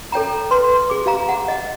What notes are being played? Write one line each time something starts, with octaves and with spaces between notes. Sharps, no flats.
A4 C#5 G5 A#5
B4 C6
G#4 D6
G4 F5 A#5
F#5
D#5 F#5